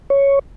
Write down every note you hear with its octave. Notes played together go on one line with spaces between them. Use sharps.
C#5